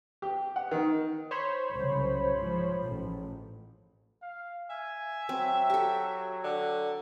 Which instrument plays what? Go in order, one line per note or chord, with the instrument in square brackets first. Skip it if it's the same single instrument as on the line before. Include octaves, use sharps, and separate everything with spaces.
[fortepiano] G4
F#5
D#3
[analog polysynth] C5 C#5 B5
[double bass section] C2 F#2 C#3
G#2 F3
A1 G#2
[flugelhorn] F5
[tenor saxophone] E5 [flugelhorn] G#5
[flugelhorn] F#3 [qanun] C4
[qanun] G4 A4
[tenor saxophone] D3